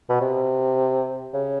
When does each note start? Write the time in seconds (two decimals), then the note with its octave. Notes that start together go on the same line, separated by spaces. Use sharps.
0.09 B2
0.21 C3
1.34 C#3